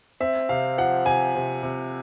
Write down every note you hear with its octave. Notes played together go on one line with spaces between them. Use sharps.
C4 E5
C3 F5
F3 F#5
C3 G#5
C3
C3